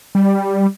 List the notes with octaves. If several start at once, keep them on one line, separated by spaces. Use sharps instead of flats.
G3